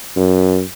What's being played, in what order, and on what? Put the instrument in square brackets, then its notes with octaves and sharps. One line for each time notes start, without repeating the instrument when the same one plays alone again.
[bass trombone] F#2